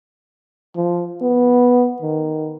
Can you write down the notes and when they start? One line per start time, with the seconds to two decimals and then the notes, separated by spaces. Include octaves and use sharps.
0.76 F3
1.22 B3
2.02 D#3